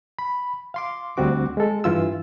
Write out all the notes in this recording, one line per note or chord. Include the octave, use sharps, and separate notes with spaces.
B5
F5 C6 D6
D2 G3 C4 F#4 D6
G#3 A4
G2 E3 F4 E6